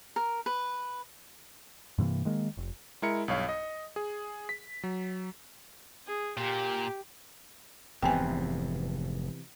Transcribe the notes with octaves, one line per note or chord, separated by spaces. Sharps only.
A#4
B4
G2 C3 E3 A#3
D#3 G#3 A#3
F1
G#3 E4 A#4 C#7
B1 G2 C#5 F5
D#5
G#4
B6
F#3
G#4
A#2 G4
F1 G#2 C3 E3 B3 G5 G#5